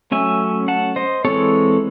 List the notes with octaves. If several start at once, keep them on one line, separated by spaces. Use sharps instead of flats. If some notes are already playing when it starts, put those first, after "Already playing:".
F#3 A3 C#4 E5 G#5
F#5 A5
C5 D#5
E3 G#3 C4 A4 C#5